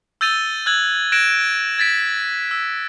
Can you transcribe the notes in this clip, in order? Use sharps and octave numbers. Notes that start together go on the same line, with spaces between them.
E6 G6 A6 D#7 F7 G7
E6 F#6 G#6 F#7
F#6 G#6 A#6 D7 E7
G#6 A6 B6 D7
E6